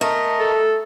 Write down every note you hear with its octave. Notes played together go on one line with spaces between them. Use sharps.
A3 A#4 D#5
A4